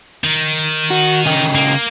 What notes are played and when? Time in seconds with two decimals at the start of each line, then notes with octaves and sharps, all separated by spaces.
0.24 D#3
0.90 F#4
1.26 C#3 D#5 G5
1.55 A#3